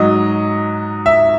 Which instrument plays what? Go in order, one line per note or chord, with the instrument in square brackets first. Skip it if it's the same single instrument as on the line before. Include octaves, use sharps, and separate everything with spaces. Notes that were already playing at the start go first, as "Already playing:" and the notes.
Already playing: [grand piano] G#2 F#3 D#5
E5